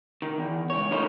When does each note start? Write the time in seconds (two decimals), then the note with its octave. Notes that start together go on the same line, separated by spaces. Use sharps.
0.22 D#3
0.38 E2
0.70 C#2 C#5
0.91 D#3 F3 A3 D#4 C5